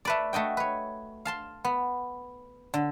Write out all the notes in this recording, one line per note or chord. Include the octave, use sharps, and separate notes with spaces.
A3 B4 D5
A3 F#4 D#5 G5
B4 C#5
F5 A5 C6
B3
D3